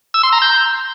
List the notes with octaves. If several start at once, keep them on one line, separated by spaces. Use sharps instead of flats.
E6
C6
A#5
G6